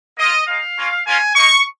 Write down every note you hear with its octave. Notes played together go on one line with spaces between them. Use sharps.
A#3 F4 D#5
G#3 D#4 F5
A#3 C#4 F4
A#3 C#4 F4 G#5
A#3 D#4 C#6